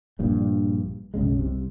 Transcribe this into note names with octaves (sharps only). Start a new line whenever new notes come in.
A#1 G2 A#2
B1 F#2 C#3 G#3
C2 C3